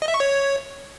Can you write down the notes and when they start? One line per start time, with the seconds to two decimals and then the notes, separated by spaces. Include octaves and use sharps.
0.02 D#5
0.08 E5
0.14 C#6
0.20 C#5